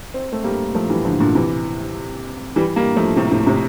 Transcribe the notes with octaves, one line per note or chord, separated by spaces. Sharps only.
C4
A3 C4
G3 A#3
F3 A3
E3 G3
D3 F3
A#2 D3
C3 E3
E3 G3
G3 A#3
F3 A3
A2 C3
A2 C3
A2 C3